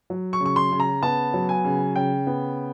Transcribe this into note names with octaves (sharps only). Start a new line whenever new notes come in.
F#3
C#6
C#3
C#6
C6
C#3
A#5
B3 A5
F#3
G#5
C#3
C#3 G5
B3